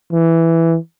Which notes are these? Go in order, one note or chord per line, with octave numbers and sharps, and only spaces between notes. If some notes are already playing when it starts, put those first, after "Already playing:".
E3